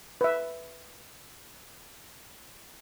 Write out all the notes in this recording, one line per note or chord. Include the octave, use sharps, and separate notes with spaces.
B4 E5